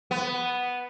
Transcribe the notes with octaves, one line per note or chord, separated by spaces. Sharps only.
B3